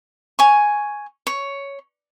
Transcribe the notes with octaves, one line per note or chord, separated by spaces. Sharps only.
G#5 C#6
C#5